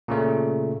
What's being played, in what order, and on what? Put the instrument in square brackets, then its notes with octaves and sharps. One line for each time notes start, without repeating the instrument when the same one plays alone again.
[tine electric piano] A#2 C#3 A3